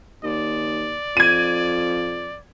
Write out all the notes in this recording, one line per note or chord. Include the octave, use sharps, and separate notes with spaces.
D#2 D5
F2 G#6 D#7